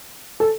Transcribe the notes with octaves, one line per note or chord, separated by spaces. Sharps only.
A4